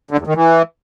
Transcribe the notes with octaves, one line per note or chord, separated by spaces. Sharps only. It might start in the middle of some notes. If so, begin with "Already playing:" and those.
D3
E2
D#3
E3